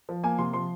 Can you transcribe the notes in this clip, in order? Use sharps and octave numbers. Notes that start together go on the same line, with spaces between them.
F3
A#3 G#5
C3 C6
F3 C6